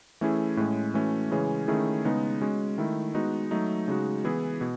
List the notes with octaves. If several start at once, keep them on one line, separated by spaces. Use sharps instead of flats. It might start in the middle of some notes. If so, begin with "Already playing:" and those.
E3 A3 C#4 E4 G#4
A2 G#3 C#4
E3 A3 C#4 F#4
C#3 E3 G#3 C#4 G#4
D#3 A3 C#4 E4 G#4
C#3 G#3 B3 D#4
G#3 C#4 F#4
D#3 A3 E4
G#3 B3 D#4 F#4
F#3 A3 D#4
C#3 G#3 D#4 F#4
E3 B3 E4 G#4
B2